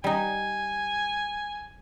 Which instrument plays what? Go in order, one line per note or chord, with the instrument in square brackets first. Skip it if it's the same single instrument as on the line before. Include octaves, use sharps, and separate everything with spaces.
[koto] G3 D#4 [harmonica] G#5